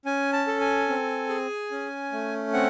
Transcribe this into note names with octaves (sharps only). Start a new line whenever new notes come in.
C#4 G#5
A5
A4
G#5
C4
G#4
C#4
A3
C4 F#5